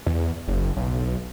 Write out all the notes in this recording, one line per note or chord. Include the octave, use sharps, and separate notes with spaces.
E2
F#1
B1